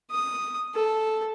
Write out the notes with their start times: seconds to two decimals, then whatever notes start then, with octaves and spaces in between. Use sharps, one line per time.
0.11 D#6
0.74 A4